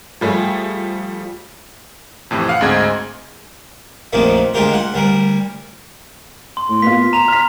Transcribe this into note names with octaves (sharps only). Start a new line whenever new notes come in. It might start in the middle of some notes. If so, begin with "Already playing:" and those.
F3 G3 A3 G#4
F2 A2 C3 E3
F5 F#5
D2 G#2 C4 G#4 D#5 G#6
A#1 F2 D#3 F3 A3 A#3
D2 G#3 F4 G4 A#4
F#5
D2 G3 A#4
C6
A2
A#3 B3 F4 B6
A#5 E7 F7
F6 B6